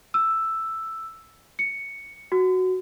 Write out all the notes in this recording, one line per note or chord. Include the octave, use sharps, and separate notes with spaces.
E6
C#7
F#4